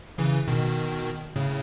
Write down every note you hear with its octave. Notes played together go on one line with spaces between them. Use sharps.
C#3 E3
B2 D#3
A2 C#3